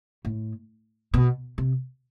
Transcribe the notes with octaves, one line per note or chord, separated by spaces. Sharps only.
A2
B2
C3